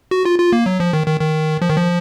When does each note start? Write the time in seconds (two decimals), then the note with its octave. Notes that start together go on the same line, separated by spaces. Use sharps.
0.11 F#4
0.25 F4
0.39 F4
0.53 A#3
0.66 F#3
0.80 F3
0.93 D#3
1.07 D#3
1.21 D#3
1.62 F3
1.69 D#3
1.76 F3